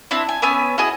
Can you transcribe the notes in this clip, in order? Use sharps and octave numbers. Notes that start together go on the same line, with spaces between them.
C4 D4 E4
G#5
B3 C#4 G#5 E6
E4 F#4 G#4 D#5